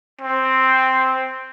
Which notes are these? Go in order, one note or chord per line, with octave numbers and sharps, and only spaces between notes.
C4